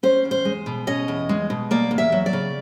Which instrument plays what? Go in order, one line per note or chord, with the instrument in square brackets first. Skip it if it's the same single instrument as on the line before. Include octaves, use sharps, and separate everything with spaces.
[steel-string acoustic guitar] C#4 C5
E2
C5
G#3
B2
C#4 D#5
E2
G#3
B2
A#3 D5
E2
E5
F#3
D5
C#3